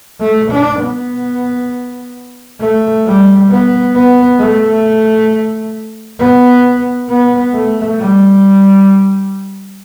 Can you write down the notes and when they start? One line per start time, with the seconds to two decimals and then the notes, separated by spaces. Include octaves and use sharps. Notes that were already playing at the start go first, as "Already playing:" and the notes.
0.20 A3
0.51 D4
0.80 B3
2.60 A3
3.05 G3
3.49 B3
3.95 B3
4.39 A3
6.19 B3
7.09 B3
7.54 A3
7.99 G3